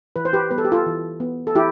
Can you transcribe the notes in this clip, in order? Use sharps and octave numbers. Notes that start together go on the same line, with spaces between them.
E3 B4
C5
G4 B4
G3 B3 B4
A4
G4
F4 A4
E3
B3
A4
E3 E4 G4